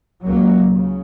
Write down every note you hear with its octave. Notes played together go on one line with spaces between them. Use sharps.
C#2 C#3 F#3 A#3
C#3